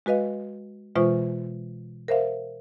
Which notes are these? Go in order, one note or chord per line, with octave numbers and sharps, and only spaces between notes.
G#3 F#4 B4 D#5 F5
B2 E3 G#3 F4 C5 C#6
A#4 C5 E5 F5